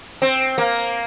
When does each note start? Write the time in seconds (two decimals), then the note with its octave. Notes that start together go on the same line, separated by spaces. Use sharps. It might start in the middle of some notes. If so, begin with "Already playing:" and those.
0.22 C4
0.58 A#3